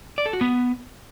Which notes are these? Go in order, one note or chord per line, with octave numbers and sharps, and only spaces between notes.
D5
A4
F#4
B3